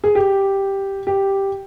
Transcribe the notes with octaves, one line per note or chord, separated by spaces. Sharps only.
G#4
G4
G4